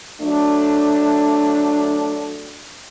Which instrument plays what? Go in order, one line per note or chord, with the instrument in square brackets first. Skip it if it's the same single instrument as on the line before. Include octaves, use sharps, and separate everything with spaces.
[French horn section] F#3 A3 D4